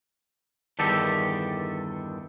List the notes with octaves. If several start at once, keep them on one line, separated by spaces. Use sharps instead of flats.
E2 G2 D3 D#3 G4 A4